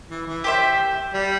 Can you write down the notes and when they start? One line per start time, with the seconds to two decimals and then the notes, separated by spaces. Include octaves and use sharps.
0.09 E3
0.27 E3
0.44 G4 C5 E5
1.13 G3